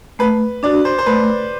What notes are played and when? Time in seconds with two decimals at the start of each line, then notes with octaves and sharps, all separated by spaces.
0.19 A3 B4
0.63 D4 F#4 D5
0.85 C5
0.98 C5
1.06 A3 B4